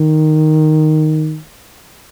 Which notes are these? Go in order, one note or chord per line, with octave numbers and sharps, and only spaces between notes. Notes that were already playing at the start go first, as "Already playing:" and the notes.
Already playing: D#3